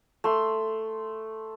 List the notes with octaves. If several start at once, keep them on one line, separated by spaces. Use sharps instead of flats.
A3 C6